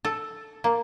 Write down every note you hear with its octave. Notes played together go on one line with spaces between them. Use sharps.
A4
A#3